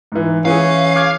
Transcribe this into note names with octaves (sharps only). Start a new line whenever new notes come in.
G#2 E3
E3 C#4 G#4 F5
D6 F6 G#6